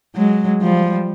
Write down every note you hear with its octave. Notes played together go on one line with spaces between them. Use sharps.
F#3 G#3
F3 G3